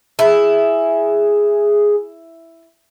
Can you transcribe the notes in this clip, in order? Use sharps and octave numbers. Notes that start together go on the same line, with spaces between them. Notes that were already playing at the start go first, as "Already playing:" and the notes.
E4 G#4